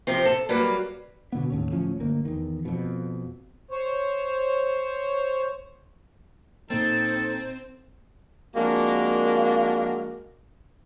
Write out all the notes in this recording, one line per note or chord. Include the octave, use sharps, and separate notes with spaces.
C3 F3 C4
A4
F#3 G3 A#3 B4
B2 D3 B3
D#2 A2 C#4
D1 A2 F3 C#4
G1 D2 A#3
E2 D#3
F2 B2
C5 C#5
A#2 A#3 C4 D#4 A4 A6
F2 G#3 A#3 D4 F#4 A#4